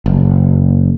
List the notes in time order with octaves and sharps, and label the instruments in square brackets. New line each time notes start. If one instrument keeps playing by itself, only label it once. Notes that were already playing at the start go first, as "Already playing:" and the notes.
[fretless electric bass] F#1